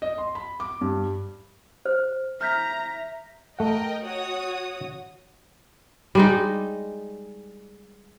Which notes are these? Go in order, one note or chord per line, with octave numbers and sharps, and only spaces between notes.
D#5
C6
B5
D6
G2
C5 F6
E5 A#5 F6 G6 B6
A3 A#4 D#5 F#5 G5
F#4 C#5 D#6
G3 G#3 D#4